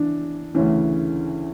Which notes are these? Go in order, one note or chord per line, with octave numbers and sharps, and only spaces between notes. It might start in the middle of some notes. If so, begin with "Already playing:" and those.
Already playing: E3 D4
D2 C#3 E3 C#4